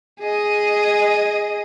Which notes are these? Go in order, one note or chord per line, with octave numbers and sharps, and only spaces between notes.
G#4 D#5